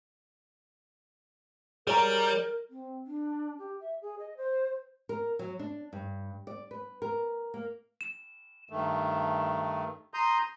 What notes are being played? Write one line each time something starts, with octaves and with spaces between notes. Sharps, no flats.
G3 G#4 A#4 C#5 A#5
C4
D4
G4
E5
G#4
D#5
C5
A#4
F#3
D4
G2
D5
B4
A#4
A#3
E7
G2 D#3 A3
A#5 C6 D#6 G6